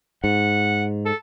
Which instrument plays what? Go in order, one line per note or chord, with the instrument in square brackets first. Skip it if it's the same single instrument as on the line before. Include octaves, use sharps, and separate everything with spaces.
[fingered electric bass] G#2 [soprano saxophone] F#5
[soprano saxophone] A4